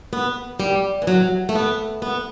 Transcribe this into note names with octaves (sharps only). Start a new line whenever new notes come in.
B3
G3
E3
F#3
A3
B3
B3